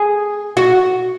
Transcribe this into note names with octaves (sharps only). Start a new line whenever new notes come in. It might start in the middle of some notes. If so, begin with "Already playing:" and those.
Already playing: G#4
F#4